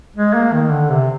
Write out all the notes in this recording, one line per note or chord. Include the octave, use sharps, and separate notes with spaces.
G#3
A#3
D#3
D3
C3